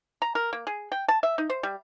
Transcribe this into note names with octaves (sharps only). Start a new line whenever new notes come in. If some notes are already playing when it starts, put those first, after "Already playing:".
A#5
A#4
A#3
G#4
G5
A5
E5
D#4
C5
G3